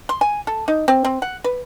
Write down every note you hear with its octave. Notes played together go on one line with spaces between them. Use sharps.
C6
G#5
A4
D#4
C4
C4
F#5
B4